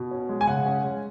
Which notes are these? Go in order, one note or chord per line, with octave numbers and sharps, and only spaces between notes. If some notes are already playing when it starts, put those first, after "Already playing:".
Already playing: B2
C#4
G#3
G#5
C#3 F#5
C#4
G#3